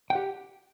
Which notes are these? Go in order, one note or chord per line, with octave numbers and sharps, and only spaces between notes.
G4 F#5 G5